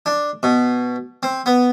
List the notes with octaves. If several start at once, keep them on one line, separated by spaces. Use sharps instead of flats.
D4
B2
C4
B3